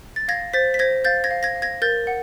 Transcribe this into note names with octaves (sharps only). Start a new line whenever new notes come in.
A6
F5 G#6 A#6
C5 A6 B6
B6
C5 G#6 A#6
F5 G6 A6
G#6 A#6
F5
G#6 A#6
F5
G#6 A#6
A#4 G6 A6
F#5